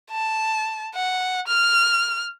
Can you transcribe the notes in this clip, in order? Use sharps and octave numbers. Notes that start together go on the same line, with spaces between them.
A5
F#5
F6